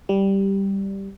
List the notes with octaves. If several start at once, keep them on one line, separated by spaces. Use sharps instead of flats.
G3